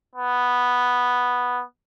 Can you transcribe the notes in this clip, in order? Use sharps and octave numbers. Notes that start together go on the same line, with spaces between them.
B3